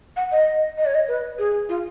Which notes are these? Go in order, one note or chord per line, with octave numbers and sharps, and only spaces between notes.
F#5
D#5
D#5
C#5
D#5
B4
G#4
F4